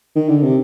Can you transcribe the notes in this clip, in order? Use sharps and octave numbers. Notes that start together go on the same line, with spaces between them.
D#3
D3
C3